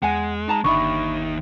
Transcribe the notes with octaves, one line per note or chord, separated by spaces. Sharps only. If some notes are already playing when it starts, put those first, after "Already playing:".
E2 G#3 F#5 G#5
D#4 A5 A#5
G1 D#2 D4 D#4 E5 B5 C#6